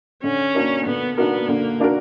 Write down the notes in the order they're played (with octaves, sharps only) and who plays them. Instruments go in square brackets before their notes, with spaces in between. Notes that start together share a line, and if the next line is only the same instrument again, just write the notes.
[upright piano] D3 [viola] C#4
[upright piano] A#3 D4 F#4 A#4
[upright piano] D3 [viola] B3
[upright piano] A#3 D4 F#4 A#4 [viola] B3
[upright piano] D3 [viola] A#3
[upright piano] A#3 D4 F#4 A#4